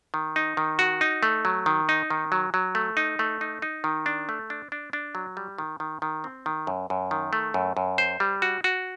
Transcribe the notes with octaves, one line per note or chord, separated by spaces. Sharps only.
D#3
D#4
D#3
F#4
D#4
A3
F#3
D#3
D#4
D#3
F#3
F#3
A3
D#4
A3
D#4
D#4
D#3
D4
A3
D4
D4
D4
F#3
G3
D#3
D#3
D#3
C4
D#3
F#2
F#2
D#3
A3
F#2
F#2
C5
G3
F#4
F#4